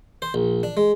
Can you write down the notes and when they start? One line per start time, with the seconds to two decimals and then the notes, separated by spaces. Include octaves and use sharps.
0.22 C5
0.34 A#1
0.63 D4
0.77 G#3